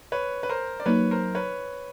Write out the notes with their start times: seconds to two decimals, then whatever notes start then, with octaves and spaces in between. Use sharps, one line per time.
0.12 B4 C#5
0.43 B4
0.49 A#4 C5
0.80 D5
0.86 F#3 A#3 D#4 B4 C#5
1.11 A#4 C5
1.35 B4 C#5